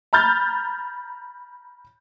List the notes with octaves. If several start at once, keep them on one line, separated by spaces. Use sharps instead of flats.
A#5 B5 F6 G6 A6